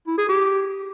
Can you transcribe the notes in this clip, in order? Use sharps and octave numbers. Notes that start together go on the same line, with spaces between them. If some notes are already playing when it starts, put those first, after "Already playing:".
E4
G#4
G4